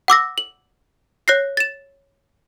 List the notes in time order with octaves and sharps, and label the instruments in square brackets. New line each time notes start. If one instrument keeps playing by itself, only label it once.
[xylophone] F#5 D6 E6 A#6
F#7
C#5 F#6 A#6 C7
A6 E7